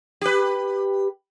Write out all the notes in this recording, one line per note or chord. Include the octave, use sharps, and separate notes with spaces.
G4 B4